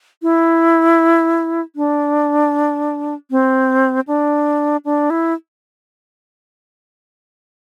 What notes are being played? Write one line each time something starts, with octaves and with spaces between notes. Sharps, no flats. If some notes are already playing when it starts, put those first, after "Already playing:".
E4
D4
C4
D4
D4
E4